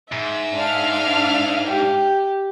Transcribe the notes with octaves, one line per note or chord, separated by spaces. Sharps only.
G#2 E5
D4 F5 F6
G4